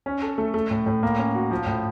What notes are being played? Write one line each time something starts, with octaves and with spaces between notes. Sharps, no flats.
C#4
A4
A3
A3
A2
A2
A#3
C#4
F#4
F3
A2